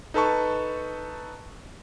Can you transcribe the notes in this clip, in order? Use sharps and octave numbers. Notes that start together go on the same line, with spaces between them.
D#4 A4 B4 A5 C#6